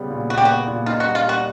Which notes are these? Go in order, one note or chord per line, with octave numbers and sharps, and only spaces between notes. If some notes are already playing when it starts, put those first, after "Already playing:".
Already playing: C#3 G3 B3
A#2
A#2 F#4
G4
B3 F#4
A#2
D#4 F4
F#4
G3
F4
G3 F#4